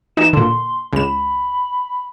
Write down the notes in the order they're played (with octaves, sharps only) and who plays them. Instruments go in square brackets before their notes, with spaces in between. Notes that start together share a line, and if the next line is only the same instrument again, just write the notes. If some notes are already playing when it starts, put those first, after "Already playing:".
[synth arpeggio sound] E3 D#4 [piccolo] E7
[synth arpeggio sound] A#2 D3 [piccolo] C6
[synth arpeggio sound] C#2 E7 [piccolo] B5